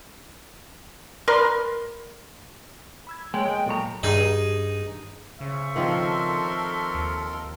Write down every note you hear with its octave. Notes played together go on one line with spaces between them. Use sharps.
A#4 B4 D5 C6
B5 E6 G#6
G#3 A#3 A#4 C#5 G5
G#3
A#2 F#3 A4 A#5 C#6
G2 D#4 G#4
C#3 C5 E5 C#6
D#3 F3 C4 A4 A#4 C6
D#2